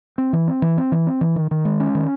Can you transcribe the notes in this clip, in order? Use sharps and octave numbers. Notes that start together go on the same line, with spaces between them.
C4
E3
C4
E3
C4
E3
C4
E3
D#3
D#3
G#3
C#4
D#3